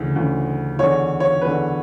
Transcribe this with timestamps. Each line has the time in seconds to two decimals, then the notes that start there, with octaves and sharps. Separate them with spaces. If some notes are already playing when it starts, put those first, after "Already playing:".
Already playing: D2 C#3 E3
0.16 D2 C#3 E3
0.79 E2 D3 C#5
1.20 C#5
1.41 E2 D3 B4